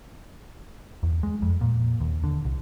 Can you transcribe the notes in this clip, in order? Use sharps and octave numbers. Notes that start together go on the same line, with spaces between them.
E2
G#3
F2
A#2
D#2
D3
C2